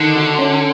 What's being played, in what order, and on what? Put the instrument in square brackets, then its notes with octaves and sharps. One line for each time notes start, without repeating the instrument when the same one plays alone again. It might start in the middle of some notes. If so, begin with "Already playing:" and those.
Already playing: [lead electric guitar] D3 [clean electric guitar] D#3
[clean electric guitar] F#4
C#4